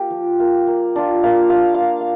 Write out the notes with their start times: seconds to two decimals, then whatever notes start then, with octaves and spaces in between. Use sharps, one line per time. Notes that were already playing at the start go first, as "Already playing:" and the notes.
Already playing: A#3 F4 G4
0.10 F3
0.39 A#3 F4
0.67 A#3
0.96 D4 F4
1.23 A#3 F5
1.50 D4 F4 F5
1.74 F5
1.80 A#3
2.01 F5